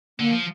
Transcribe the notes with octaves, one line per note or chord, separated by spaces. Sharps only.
D3 A#3
F3